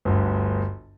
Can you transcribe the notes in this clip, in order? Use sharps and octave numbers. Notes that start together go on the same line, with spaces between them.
G1 D2